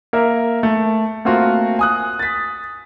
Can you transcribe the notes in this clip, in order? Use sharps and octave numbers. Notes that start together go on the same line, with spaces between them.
A#3 A#4 E5
A3
A3 A#3 C4 F4 F#4
G#5 D#6 F#6
A6 B6